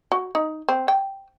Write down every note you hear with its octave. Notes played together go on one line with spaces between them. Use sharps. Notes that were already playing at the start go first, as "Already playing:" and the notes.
F#4
D#4
C4
G5